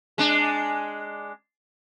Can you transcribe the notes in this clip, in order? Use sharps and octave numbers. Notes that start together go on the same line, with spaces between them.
G#3 D4